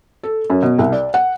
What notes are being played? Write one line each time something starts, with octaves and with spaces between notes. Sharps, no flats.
A4
F#2
B2
C2
D5
F#5